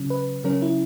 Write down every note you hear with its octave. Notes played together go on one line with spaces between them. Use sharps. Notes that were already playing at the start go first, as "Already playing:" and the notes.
Already playing: C#3 F#3 C#4
B4
C#3 F#3 C#4 A#4
E4